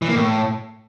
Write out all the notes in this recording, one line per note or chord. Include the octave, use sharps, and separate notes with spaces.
E3
A#3
A2